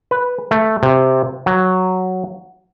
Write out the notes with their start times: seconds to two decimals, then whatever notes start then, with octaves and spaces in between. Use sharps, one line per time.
0.11 B4
0.51 A3
0.83 C3
1.46 F#3